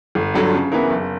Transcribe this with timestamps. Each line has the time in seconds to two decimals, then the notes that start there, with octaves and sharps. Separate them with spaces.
0.15 G1
0.34 G2 D3 F#3
0.54 C#3
0.72 E3 B3 E4 A#4
0.91 F#1